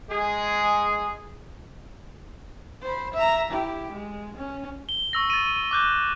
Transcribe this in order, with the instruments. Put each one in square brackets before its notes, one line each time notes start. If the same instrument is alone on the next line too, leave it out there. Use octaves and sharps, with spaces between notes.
[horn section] G#3 G#4
[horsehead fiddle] C5 B5
E5 A#5
E4 G4
G#3
C#4
[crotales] G7
C#6 E6 A#6
A6 D#7
D6 F#6 G6